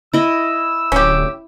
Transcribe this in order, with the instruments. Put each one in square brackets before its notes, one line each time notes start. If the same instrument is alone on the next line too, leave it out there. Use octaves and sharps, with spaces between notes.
[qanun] E4 D#5 [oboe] E6
[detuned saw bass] D1 [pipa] C#4 G4